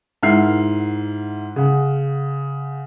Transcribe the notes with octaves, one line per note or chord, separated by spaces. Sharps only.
G#2 E4 A#4 F#5 F6 C7
C#3 F#5